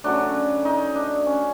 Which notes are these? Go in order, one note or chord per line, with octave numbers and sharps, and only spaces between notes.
C#3 F#3 A3 D4
D#4
D4
C#4